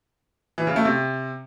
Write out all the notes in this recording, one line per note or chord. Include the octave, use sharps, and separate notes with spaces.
E3
C#3
A3
C3